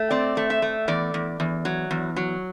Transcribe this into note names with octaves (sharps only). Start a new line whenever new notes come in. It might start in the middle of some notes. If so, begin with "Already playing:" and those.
Already playing: A3
C4 D5
A3
E5
A3
E2 D5
E2
E2
F#3
E2
F#3